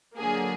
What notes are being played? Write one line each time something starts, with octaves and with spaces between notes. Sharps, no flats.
D3 F#3 A#3 G#4